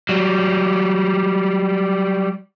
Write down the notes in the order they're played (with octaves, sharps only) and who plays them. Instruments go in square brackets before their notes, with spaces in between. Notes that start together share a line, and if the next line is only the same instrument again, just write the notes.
[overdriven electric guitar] F#3 G3